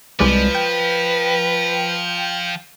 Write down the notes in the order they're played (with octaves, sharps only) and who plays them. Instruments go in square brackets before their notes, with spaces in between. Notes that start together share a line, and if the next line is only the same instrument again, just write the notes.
[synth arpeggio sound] C2 G#3 D5 [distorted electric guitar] F3 [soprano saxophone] B4
[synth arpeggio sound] G5